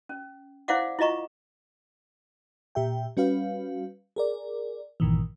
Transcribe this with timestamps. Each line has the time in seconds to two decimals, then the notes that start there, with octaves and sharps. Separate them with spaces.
0.09 C#4
0.68 E4 C5 D5 F5 F#5 D6
0.99 E4 F4 D#5 A#5 C#6
2.75 A#2 G4 E5 G5
3.17 G3 C#4 F#4 B4 F5
4.16 G#4 A#4 D5
5.00 A#1 G2 A#2 D#3 E3